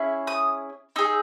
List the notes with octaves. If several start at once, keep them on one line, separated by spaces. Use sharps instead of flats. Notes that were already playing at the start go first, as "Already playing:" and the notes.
Already playing: C#4 E4 G#4
D#6
D#4 G#4 E6